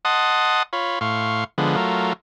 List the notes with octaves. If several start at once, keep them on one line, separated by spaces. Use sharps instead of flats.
D#5 F#5 A5 C6 D#6
F4 C#5 B5
A2 F5 C6 C#6
D3 F3 G#3 B3
F#3 A3 F4 A#4